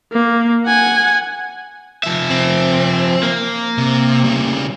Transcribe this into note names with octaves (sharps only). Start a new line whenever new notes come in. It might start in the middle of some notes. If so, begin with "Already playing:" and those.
A#3
F#5 G#5
F3 E5
C4
A#3
C3
C#3 G3